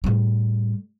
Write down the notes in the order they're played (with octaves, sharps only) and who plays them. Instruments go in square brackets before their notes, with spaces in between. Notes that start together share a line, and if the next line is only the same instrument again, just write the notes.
[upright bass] A2 G3